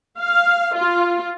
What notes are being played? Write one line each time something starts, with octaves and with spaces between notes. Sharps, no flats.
F5
F4